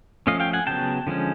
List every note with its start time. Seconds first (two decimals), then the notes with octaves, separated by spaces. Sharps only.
0.27 F3 A3 C#4 D#5 F5
0.40 F5 G5
0.53 F#5 G#5
0.67 C#3 F#3 B3 G5 A5
1.07 D3 F3 G#3 C#4